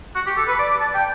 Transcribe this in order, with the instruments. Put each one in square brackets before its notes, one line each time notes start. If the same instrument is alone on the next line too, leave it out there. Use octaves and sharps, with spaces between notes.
[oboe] F#4
G4
A4
B4
D5
A5
G5